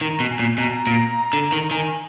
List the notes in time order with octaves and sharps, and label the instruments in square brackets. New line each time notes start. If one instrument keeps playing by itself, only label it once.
[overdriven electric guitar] D#3 [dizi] A#5
[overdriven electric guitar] B2
[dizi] G#5
[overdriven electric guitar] A#2
[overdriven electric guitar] B2 [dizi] A#5
[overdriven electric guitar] A#2
D3
D#3
[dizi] A#5
[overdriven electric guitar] D#3 [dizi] G#5